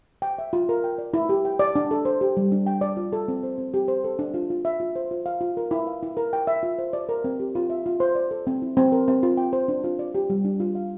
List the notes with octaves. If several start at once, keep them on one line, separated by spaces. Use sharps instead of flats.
G5
E5
F4
A#4
G5
D5
E4
G4
G5
D5
D4
A4
C5
G4
G3
D4
G5
D5
F4
A4
C4
C5
C4
G4
C5
A4
D4
F4
F4
E5
F4
C5
F4
F5
F4
A#4
E4
F5
E4
A#4
G5
E5
F4
C5
D5
A#4
C4
G4
F4
E5
F4
C5
D5
A4
C4
E4
C4
A#4
C4
F4
G5
C5
D4
F4
D5
G4
G3
D4
F4
F5